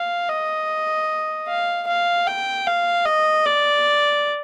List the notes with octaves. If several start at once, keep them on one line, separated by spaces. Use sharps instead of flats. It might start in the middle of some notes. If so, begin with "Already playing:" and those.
Already playing: F5
D#5
F5
F5
G5
F5
D#5
D5